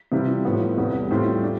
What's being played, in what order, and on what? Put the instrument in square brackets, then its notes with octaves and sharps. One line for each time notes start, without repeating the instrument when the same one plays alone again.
[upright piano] C3 E3 G3 C4 F4
A2 F3 B3
E2 C3 G3 B3
A2 G3 C4 F4
D4